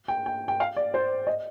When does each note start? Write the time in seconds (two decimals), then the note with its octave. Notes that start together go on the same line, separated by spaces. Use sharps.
0.08 G5
0.26 G5
0.48 G5
0.60 F5
0.76 D5
0.94 C5
1.27 D#5